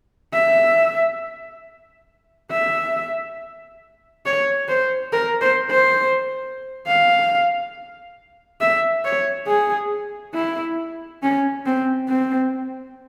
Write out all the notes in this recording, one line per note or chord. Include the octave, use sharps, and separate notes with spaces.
E5
E5
C#5
C5
A#4
C5
C5
F5
E5
C#5
G#4
E4
C#4
C4
C4